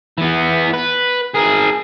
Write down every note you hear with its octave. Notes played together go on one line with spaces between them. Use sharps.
E3 B3
B4
G#4 A#4